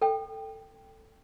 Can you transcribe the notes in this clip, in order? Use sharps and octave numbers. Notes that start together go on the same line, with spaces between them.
A4 G5